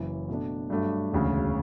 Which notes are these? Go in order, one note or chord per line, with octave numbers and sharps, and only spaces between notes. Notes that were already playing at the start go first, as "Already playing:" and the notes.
Already playing: F#1 F#2 E3
B2 A3 D4
G2 F#3 A3 D4
E1 D2 C#3